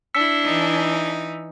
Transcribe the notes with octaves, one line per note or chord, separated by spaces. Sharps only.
D4 E4 E6 B6 C#7
E3 D#4